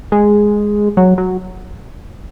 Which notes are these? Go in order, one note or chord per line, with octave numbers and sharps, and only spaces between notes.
G#3
F#3
F#3